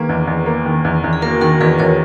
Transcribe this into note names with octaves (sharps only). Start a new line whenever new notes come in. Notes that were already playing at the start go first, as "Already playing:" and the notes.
Already playing: D#3 A#3 G#4 B4
E2
E2
A#3
D#3
E2
E2
G#4
A#3 F#4 A#4
D#3 F#4 A#4
E2 G#4 B4
E2 A#4 C#5